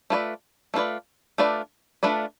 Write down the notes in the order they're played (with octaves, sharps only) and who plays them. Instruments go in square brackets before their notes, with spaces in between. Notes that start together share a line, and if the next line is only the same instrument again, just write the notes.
[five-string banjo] A3 D4 F4 B4 D5
A3 D4 F4 B4 D5
A3 D4 F4 B4 D5
A3 D4 F4 B4 D5